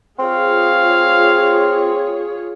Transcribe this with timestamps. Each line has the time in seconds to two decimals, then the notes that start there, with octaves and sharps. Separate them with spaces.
0.19 C4 F4 G#4 C#5 F5